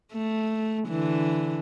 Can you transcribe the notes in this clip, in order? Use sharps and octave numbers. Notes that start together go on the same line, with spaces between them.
A3
D3 E3